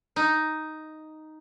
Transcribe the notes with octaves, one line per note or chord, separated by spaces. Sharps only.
D#4